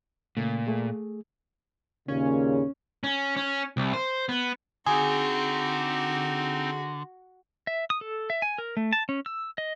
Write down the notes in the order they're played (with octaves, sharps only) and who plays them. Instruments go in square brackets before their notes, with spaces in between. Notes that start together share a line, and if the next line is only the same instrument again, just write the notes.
[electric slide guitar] A#2 [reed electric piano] C#3 A3
[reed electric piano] A3 G#4
[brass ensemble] D#2 A#2 C#3 [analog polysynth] C#4
[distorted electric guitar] C#4
C#4
C2
C5
B3
[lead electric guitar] D3 [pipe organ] C4 D#4 [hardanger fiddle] F#4 [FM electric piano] G#4
[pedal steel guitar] E5
D#6
A4
E5
G#5
A#4
A3
A5
C#4
E6
D#5